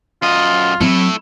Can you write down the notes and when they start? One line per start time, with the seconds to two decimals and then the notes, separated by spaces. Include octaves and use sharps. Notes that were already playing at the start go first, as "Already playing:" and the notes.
0.22 F#2 F4 D#5
0.81 F#3 A3 C4 E4